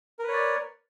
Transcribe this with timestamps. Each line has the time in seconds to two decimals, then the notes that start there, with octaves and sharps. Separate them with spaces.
0.19 A#4
0.24 B4
0.28 C#5
0.33 D5